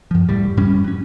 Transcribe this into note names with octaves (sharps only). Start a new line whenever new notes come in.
F#2 F3
E1 A2 G3
F#2 A2 G3 C#4
F#3 C#4